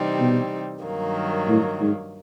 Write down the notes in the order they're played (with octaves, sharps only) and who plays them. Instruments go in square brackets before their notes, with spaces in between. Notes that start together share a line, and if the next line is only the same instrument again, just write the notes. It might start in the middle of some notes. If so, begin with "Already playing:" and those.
Already playing: [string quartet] C3 E3 G3 C4 D#4
[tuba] B2
[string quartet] G2 D#3 F#3 A#3
[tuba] A2
G#2